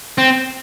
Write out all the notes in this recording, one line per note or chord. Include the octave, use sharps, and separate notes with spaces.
C4